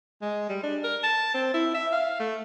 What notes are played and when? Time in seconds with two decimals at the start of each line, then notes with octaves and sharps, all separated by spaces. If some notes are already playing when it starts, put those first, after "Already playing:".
0.22 G#3
0.49 G3
0.63 D4
0.84 A#4
1.03 A5
1.34 C4
1.54 E4
1.74 E5
1.92 F5
2.20 A3